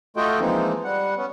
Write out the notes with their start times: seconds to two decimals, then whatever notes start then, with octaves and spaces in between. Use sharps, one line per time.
0.17 A3 F4 F#4 A4 D#5 G5
0.40 E3 F3 G#3 A#3 C4 D#4
0.84 G3 F#5
1.17 B3 C#4